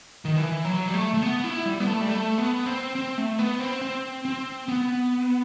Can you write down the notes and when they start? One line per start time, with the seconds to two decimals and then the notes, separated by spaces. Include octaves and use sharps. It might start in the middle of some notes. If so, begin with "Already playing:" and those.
0.25 D#3
0.37 E3
0.65 F#3
0.87 G3
0.94 A3
1.14 A3
1.22 B3
1.44 E4
1.66 G3
1.80 B3
1.87 A3
2.01 G3
2.09 A3
2.38 B3
2.66 C4
2.95 C4
3.17 A3
3.39 B3
3.60 C4
3.81 C4
4.25 C4
4.68 B3